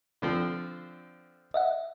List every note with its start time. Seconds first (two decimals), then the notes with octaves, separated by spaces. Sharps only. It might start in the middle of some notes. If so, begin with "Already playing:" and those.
0.22 D3 F3 C4
1.54 D#5 E5 F#5